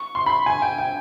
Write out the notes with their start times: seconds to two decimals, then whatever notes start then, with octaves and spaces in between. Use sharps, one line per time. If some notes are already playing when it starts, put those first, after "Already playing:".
Already playing: C#6
0.15 C6
0.26 B5
0.46 G#5
0.62 G5
0.78 G5